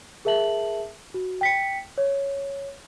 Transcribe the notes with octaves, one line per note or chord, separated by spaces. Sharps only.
G#4 A#4 E5 A5 F#7
F#4
G5 B6 C#7
C#5